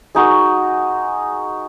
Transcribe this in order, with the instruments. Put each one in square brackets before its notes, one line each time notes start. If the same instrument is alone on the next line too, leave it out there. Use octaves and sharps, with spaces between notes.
[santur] G#3 D#4 F#4 A#4